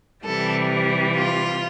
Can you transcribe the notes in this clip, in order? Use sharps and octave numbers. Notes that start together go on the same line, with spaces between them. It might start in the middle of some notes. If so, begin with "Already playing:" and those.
C3 E3 G3 A4
F4